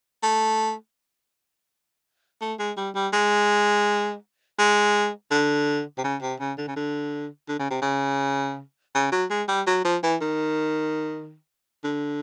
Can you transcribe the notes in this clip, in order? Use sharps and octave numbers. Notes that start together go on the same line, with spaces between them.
A3
A3
G#3
G3
G3
G#3
G#3
D3
C3
C#3
C3
C#3
D3
C#3
D3
D3
C#3
C3
C#3
C#3
F#3
G#3
G3
F#3
F3
E3
D#3
D3